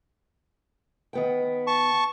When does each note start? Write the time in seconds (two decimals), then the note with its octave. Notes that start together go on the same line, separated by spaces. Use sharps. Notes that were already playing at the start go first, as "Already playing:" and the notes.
1.13 D#3 B3 G5
1.67 A5 C#6